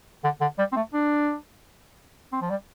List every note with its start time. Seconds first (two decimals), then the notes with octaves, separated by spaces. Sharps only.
0.24 D3
0.41 D3
0.58 G3
0.72 C4
0.76 A3
0.93 D4
2.32 C4
2.41 F3
2.50 G3